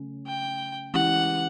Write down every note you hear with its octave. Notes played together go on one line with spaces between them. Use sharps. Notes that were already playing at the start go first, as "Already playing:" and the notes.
Already playing: C#3 F#3 A3 C#4
G5
E3 G#3 C#4 E4 G4 F#5